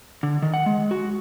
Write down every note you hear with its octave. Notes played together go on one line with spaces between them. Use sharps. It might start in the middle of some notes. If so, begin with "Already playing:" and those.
D3
D#3
F#5
G#3
F#4